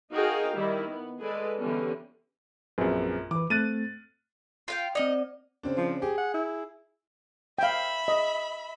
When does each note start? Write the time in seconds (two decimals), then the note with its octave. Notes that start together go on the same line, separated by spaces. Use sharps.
0.12 D#4 F#4 G#4 A#4 F5 G5
0.56 D#3 G3 E4
0.89 B3
1.21 G#3 G#4 A4 B4 D5
1.60 D3 E3 G3 B3 C#4
2.78 A#1 F#2 C4 G#4 B4
3.31 E3 B4 D6
3.50 A3 C4 F#6 A6 D#7
4.68 F4 F5 G5
4.95 C4 D#4 D5 D#5
5.63 C#3 C4 D4
5.78 F3
6.02 G4 G#4
6.18 F#5
6.34 E4
7.59 E5 F5 G5 B5
8.08 D#5